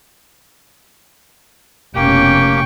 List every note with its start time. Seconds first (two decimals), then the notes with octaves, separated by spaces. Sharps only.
1.95 F1 B2 A#3 C#4 G4 G5 C#6